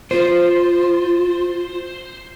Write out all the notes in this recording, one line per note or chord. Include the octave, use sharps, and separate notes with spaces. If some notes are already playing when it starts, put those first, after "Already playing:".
F4 C5